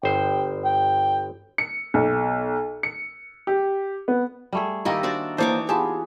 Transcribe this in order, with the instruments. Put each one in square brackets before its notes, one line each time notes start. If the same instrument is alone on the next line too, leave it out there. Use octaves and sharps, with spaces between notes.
[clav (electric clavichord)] G1 C5 [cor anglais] G5
[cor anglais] G5
[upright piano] C#7
B1
C#7
G4
B3
[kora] G3 A3 G#4
[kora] D#3 A#3 E4 [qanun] G3 G4 D#5 [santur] D#4 E6
[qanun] D4 F#4 D5 [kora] C5
[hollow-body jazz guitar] D#2 A#3 C5 [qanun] E3 C#5 D6 [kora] D4 [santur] D#4
[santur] B3 F4 G#4 [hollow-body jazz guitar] G4 A5